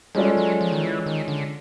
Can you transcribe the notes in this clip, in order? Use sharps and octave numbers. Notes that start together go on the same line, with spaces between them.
G3 G#3 C#4 F4 A4 D5
F#3
F3
D#3
E3
D#3
D3